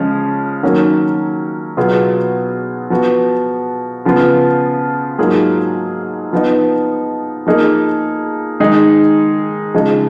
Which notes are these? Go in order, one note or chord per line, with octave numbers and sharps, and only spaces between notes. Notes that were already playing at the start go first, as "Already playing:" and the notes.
Already playing: C#3 F3 G#3 C#4
D#3 F#3 A#3 C#4 F#4
B2 F#3 B3 F4 G#4
F3 B3 F#4
C#3 F3 B3 F4
G#2 F#3 A#3 F4 G#4
F3 B3 D#4
F3 A#3 D#4 G#4
D#3 G#3 D#4 G#4
C#3 F3 G#3 D#4 G#4